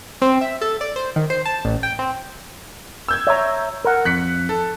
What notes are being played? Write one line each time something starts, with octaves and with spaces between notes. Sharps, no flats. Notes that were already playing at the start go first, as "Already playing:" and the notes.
C4
E5
A4
D5
C5
D#3
C5
A5
A1
G5
C4
E6 G6 G#6
C#5 E5 A#5
A#4 F#5
F2 F#6 B6 C#7
A4